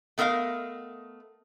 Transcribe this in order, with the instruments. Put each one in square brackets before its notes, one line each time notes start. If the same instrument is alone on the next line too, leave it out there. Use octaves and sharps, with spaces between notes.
[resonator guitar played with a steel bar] A3 B3 A#4 D#5 F5